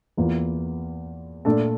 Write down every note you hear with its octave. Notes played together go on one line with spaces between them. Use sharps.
E2 E3 A#3 F4
A#2 A3 D4 A4 D5